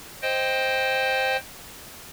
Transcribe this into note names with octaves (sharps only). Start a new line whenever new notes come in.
C5 D#5 G5